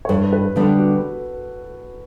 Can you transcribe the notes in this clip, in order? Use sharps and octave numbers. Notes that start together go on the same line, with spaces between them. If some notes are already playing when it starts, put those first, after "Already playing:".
C#5
G2 B4
B4
D3 G3 B3 D4 A4
F#4